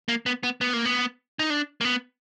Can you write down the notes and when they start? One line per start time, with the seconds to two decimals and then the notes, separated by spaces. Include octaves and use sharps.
0.08 A#3
0.26 B3
0.43 B3
0.61 B3
0.73 A#3
0.85 B3
1.39 D#4
1.50 D4
1.81 A#3
1.84 B3